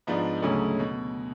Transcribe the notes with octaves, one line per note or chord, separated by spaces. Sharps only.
G#2 F3 B3 D4
D2 C#3 F#3 A3 C#4
B2